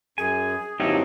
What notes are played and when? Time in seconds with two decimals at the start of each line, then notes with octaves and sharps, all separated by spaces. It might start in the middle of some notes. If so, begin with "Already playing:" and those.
0.18 F#2 G#4 G#5
0.80 G2 F#3 C4 D#4 E4 G4 D#5